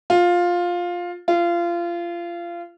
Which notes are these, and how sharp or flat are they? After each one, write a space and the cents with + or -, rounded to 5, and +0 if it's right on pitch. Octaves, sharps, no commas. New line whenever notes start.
F4 +10
F4 -25